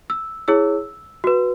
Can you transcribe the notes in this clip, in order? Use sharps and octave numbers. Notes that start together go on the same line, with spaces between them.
E6
E4 G#4 C#5 E6
F#4 B4